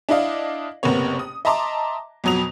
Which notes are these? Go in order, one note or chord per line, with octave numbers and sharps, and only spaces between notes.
D4 E4 D5 D#5 F5
F#1 C3 A#3 B3 C#5
D#6
D#5 E5 A5 A#5 C6 D6
F2 B2 F#3 D#6 F7